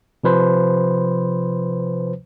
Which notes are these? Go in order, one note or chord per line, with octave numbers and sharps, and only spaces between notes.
C3 F3 B4 C5